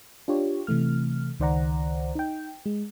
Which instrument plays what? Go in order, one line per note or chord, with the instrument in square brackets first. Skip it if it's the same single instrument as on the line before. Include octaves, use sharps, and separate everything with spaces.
[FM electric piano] D4 F4 G4 C#5
C3 E3 A3 F6
C#2 D#3 C5 D5 F#5 A#5
D#4 G5
G#3